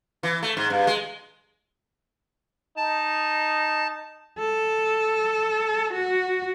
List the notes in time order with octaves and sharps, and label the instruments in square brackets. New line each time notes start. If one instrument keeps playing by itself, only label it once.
[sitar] E3
A3
G#2
G2
G#3
[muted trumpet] D#4 [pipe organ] A5
[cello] A4
F#4